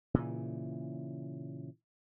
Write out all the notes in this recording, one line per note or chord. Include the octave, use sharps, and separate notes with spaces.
A#2 C#3 E3